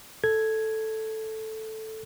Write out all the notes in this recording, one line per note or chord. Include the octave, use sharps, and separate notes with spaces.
A4 G#6